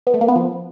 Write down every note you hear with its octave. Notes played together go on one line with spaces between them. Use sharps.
B3
A3
A#3
B3
F3